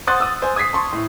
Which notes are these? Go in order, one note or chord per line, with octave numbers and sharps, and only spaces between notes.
C5 F#5 C6 D#6 F#6 A6
D#6 E6
C5 G#5
D#6 G#6 A6 B6 C7
A5 C6 C#6
A2